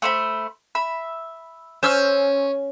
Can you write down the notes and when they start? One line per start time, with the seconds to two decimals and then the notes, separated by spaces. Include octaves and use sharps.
0.02 A3 C5 B5
0.75 E5 B5
1.83 C#4 C5 E6 F6